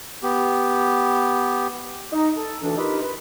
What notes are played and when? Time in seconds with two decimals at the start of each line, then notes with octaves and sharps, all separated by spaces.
0.23 B3 G4
2.13 D#4
2.36 A4
2.62 D2 E3 D4
2.77 D#4 F4 G4 A#4 B4
3.01 B4